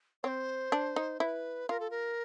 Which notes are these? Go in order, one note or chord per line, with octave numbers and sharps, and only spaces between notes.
C4 C5 C#5
D4
D#4
E4 B4 C5
F4 A#4
A4
A#4